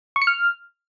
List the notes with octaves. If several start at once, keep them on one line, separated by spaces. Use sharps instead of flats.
C#6
C#7
F6